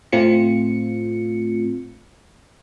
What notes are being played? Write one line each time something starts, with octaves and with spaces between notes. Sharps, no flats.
A2 A3 C4 F4 C#7